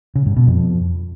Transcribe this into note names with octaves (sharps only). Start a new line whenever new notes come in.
C#3
G2
B2
F2